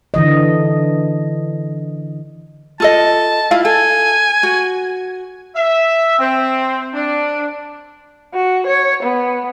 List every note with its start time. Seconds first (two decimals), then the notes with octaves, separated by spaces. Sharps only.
0.14 D3 E3 D#5
2.80 F4 A4 D#5 A5
3.51 E4 F4 F5
3.65 A4 G#5
4.43 F#4
5.56 E5
6.19 C4
6.94 D4
8.34 F#4
8.67 C#5
9.03 B3